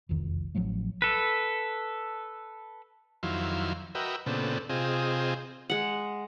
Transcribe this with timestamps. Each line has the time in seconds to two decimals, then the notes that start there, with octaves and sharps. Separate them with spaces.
0.09 E1 C2 F2 D#3
0.55 A1 F3 F#3 A3
1.02 A4 B4
3.23 F2 D#3 F#3 E4 F5 C6
3.95 F#4 A#4 B4 D#5 E5 G5
4.26 A#2 C#3 B3 C4 D4 A4
4.69 C3 C4 F4 G#4 D#5
5.70 G#3 F#5